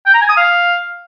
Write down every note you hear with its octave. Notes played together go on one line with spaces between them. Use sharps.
G5
A#5
G#5
D#6
F5